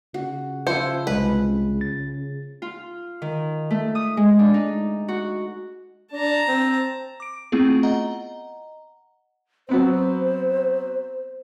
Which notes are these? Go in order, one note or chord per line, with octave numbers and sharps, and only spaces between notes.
C#3 F#4
F3 E4 C5 C#7
C2 G#3 B4
C#3
A6
F4
D#3
A3
D#6
G#3
D4
D#4
F#4
D4 A5 A#5
C4
D6 D7
A3 B3 C4 E4 F4 G#4
D#5 F#5 A#5
F#3 B3 C4 C5